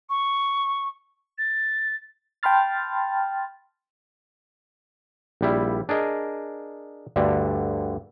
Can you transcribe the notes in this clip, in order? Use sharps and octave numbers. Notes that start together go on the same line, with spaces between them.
C#6
A6
G5 A5 B5 C6 F6 A6
A#1 G3 E4
D4 G#4 A#4 D#5
D2 G2 D3